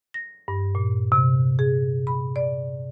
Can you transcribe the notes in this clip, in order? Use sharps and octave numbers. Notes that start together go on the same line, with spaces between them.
A#6
G2
A#2
C3
G#4
B5
D5